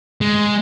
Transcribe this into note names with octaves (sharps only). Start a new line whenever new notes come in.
G#3